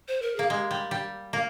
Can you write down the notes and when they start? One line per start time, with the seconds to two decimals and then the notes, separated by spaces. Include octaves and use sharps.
0.08 C5
0.22 A#4
0.36 A#3 G#4
0.50 G#3 G4
0.71 G3
0.91 G3
1.33 A#3